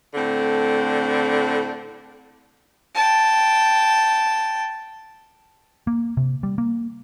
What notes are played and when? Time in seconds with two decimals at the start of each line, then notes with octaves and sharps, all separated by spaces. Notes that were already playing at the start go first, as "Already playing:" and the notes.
0.15 A2 D3 C4
2.95 G5 A5
5.87 A#3
6.17 C3
6.43 G3
6.58 A#3